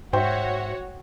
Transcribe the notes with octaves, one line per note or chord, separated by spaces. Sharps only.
G#2 F#4 C5 C#5 E5 G5